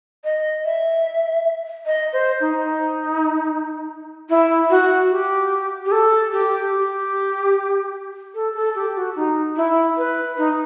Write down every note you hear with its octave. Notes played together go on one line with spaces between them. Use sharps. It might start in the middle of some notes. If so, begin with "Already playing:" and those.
D#5
E5
D#5
C5
D#4
E4
F#4
G4
G4
A4
G4
G4
A4
A4
G4
F#4
D#4
E4
B4
D#4